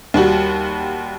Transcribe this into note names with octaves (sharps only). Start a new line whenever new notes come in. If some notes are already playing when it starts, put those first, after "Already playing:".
D#2 G3 F#4